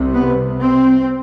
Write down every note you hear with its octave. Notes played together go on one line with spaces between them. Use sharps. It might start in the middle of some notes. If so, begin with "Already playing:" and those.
Already playing: C2 C3
B3
C4